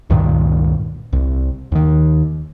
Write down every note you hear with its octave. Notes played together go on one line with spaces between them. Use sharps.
C#2 G2 A#2 D#3
C2
D#2 D#3